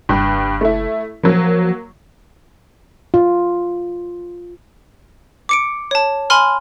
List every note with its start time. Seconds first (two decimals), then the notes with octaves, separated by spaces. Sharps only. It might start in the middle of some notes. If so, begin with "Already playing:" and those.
0.09 F#1 G2 G5
0.61 A3 E4
1.24 F3 F#3 A#3
3.14 F4
5.49 D6 C#7 D7
5.91 C#5 A5
6.30 G#5 B5 C6 F6